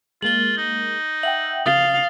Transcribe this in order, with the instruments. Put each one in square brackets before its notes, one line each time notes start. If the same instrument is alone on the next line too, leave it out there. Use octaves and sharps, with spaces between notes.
[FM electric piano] G#3 A#3 [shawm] F4 [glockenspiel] F#7 G7
[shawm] D#4
[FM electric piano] E5 F#5 G5 [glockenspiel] F#7
[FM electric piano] C#3 [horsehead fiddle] F5 [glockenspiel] D#6 A6 G7